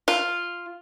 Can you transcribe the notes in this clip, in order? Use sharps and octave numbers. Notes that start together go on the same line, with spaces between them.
F4